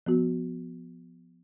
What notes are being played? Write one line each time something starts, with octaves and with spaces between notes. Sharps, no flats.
F3 B3 F#4